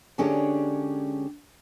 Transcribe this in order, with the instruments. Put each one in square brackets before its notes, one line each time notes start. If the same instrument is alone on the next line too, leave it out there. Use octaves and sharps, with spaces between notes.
[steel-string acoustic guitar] D3 G#3 C#4 D4 G4 C#5